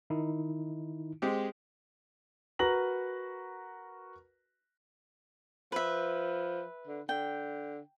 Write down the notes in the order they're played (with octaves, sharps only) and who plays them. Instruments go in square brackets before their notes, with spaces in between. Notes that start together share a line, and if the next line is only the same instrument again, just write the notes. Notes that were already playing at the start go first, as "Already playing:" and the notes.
[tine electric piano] D#3 D#4 E4
[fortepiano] G#3 C4 G4
[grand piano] F#4 A#4 B4 A#5 A#6 F#7
[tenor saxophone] F3 [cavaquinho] B4 E5
[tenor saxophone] D3
[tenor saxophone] D3 [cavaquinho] G5